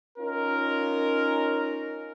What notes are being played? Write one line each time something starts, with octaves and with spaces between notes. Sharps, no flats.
C#4 D#4 F4 A#4